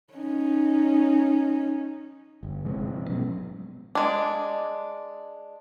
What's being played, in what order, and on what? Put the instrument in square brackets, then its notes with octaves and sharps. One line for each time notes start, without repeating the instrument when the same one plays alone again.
[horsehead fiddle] C#4 D#4
[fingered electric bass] G1
C3 F3 G#3
B2 F#3 C#4
[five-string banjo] G#3 D4